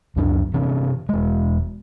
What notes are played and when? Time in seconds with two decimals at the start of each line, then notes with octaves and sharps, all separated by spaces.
0.16 C#2 F#2 D4
0.54 C3 E3 C#4
1.09 E1 G#3